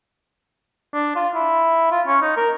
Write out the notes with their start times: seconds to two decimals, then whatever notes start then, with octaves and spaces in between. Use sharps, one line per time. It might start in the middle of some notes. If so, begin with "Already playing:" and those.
0.94 D4
1.16 F4
1.35 E4
1.91 F4
2.07 C#4
2.22 D#4
2.37 A#4